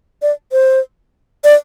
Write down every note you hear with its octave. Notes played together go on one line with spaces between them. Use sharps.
D5
C5
D5